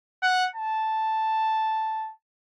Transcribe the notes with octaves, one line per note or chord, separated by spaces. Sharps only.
F#5
A5